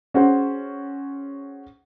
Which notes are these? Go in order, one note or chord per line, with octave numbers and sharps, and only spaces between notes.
C#4 F#4 G#4 C5